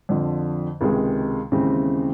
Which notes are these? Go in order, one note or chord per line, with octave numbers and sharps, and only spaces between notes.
F2 D3 F3
C#2 C3 D#3 G#3
D#2 C#3 E3 G#3 C4